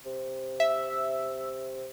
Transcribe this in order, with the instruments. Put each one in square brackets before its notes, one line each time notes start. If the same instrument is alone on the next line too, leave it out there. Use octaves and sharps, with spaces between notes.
[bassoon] C3
[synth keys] E5